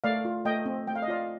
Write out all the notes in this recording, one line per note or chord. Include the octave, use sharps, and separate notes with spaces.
A3 D5 F5
F4
A3 D#5 G5
C4
A3 G5
F5
D#5
F4 D5 F5